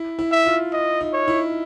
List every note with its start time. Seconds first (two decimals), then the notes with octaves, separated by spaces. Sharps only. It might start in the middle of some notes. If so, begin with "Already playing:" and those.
Already playing: E4
0.19 E4
0.32 E5
0.46 F4
0.73 D#5
1.01 D#4
1.13 C#5
1.28 E4